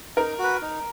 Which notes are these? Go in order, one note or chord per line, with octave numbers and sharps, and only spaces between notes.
D#4 A#4
F#4 B4
D#4